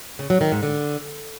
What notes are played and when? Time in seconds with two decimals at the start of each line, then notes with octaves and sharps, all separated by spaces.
0.19 C#3
0.30 F#3
0.41 D#3
0.52 G#2
0.63 D3